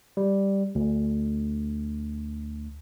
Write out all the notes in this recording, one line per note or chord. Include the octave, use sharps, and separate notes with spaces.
G3
D2